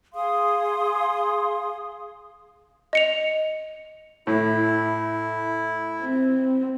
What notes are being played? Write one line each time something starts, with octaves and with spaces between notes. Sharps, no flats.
G#4 F5 C6 D#6
D#5 C#7 F7
A2 E4
C4